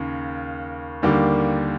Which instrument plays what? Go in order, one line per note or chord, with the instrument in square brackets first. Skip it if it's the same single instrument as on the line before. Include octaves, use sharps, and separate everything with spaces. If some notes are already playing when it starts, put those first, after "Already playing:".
Already playing: [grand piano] D#2 C#3
D#2 D3 G3 A#3